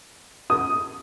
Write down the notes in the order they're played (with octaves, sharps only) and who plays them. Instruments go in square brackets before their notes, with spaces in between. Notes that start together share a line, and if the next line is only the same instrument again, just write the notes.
[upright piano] D#6